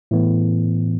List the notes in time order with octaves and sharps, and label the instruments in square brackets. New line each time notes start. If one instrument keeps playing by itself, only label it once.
[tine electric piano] A2 E3 B3